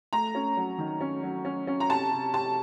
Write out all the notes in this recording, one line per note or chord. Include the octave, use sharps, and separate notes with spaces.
A3 A#5
C#4
F#3
D#3
C#4
F#3
C#4
C#4
A#5
C3 A5
C3
C3 A5